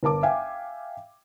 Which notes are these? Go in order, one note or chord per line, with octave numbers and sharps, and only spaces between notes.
G1 A#4 A5 D6
E5 F5 G5 G#5